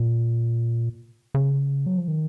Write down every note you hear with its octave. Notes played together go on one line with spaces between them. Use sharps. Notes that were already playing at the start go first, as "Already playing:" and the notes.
Already playing: A#2
C#3
F#3
F3
D#3